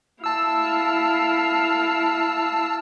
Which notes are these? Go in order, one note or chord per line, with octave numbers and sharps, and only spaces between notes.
E4 F5 A5 E6